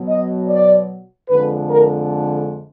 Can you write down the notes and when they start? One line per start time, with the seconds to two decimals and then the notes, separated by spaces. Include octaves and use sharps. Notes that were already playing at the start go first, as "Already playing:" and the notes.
Already playing: B2 F#3
0.09 D#5
0.49 D5
1.29 F2 D3 G#3 B4
1.69 A#4